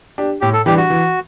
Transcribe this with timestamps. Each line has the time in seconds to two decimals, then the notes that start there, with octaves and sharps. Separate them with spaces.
0.18 D4 G4
0.41 A2 G4
0.53 A4
0.66 E3 G3 D4 G4
0.77 F#4
0.90 E3